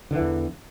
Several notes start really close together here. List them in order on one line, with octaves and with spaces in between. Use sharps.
D3 E3 E2